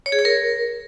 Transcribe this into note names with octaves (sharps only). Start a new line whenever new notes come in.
C#5
G#4
C#5
A#4